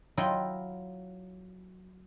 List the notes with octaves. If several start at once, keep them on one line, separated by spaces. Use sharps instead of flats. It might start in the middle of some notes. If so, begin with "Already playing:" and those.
F#3 E4 F4 D#5 G5